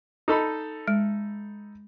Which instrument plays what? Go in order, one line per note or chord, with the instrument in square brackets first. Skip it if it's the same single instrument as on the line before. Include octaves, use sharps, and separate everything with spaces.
[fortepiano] D#4 A4 B5
[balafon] G#3